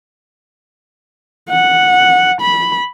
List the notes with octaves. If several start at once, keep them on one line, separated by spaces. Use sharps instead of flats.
F#5
B5